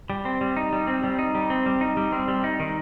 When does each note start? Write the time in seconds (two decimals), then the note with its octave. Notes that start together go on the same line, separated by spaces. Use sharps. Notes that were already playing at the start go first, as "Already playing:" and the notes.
0.10 G3
0.25 C4
0.41 G3
0.57 D#4
0.73 G3
0.87 C4
1.04 G3
1.19 D#4
1.35 G3
1.50 C4
1.66 G3
1.81 D#4
1.97 G3
2.12 C4
2.28 G3
2.44 D#4
2.60 D#3